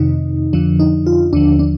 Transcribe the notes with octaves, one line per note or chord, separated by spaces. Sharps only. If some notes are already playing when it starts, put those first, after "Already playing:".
Already playing: F2 C3 D#3 D#4
F2 D3 F3 D4
D#4
F4
D#2 D3 F3 D4
D4